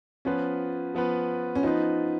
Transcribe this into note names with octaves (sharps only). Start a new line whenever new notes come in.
F3 B3 C#4 F4 B4
F3 B3 F4 B4
C#4
F3 B3 D#4 F4 B4